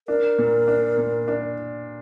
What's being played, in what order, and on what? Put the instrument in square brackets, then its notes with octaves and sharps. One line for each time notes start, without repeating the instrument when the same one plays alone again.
[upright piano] D4 [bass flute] A#4
[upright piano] A#2
D4
A#2
D4